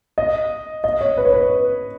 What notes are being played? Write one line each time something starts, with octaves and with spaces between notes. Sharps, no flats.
D#5
D#5
C#5
B4
C#5
B4